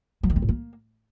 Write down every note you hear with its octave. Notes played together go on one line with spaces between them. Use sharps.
F#3
D#3
C4
A2
A#3